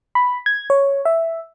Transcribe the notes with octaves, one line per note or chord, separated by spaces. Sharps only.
B5
G#6
C#5
E5